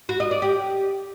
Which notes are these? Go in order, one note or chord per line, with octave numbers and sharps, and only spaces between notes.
F#4
D#5
D5
G4